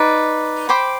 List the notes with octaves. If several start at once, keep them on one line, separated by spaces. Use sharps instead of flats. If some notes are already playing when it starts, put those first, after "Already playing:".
Already playing: D#4 B4 D5
C5 G5 B5 D6